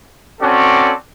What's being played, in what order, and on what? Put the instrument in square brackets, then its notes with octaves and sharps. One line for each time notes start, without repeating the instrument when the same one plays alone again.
[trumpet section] C4 C#4 F#4 A4 D5